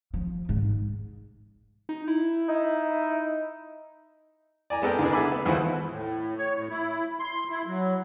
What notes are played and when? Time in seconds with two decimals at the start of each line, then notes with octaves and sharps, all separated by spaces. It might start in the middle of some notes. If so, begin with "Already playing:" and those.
0.14 F3
0.49 G#2
1.89 D#4
2.08 E4
2.48 D#4
4.70 D5 G#5 A#5
4.82 G#3 B3 A4 A#4 G5
4.99 D2 D4 G#4
5.13 G#4 A4 E5 G#5 B5 D6
5.32 B3
5.46 D#2 E3 E4 F4 C5 F#5
5.90 A2
6.38 C#5
6.56 A2
6.70 E4
7.20 C6
7.50 E4
7.67 F#3